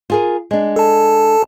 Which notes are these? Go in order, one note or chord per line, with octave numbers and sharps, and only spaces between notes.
F4 G#4 A#4
G#3 D4
A4 A5